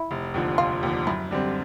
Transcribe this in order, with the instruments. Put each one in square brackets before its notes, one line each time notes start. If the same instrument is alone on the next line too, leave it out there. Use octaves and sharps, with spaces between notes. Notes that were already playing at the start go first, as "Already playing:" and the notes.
Already playing: [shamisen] E4
[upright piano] F1
D#2 D3 F3
[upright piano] F1 [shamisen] F4
[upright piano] D#2 D3 F3
[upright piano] F#2 [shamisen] E4
[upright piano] D3 G3 C4